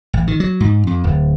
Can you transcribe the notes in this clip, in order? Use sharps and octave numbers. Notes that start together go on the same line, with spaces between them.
A1
D#3
F#3
G#2
F2
D1